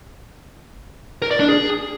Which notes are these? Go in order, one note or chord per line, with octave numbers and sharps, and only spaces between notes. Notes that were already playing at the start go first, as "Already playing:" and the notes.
A#4
D5
D4
G#4